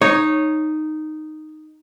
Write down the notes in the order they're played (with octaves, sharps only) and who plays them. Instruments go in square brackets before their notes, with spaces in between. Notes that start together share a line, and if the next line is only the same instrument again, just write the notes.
[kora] D#4 [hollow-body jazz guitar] C#5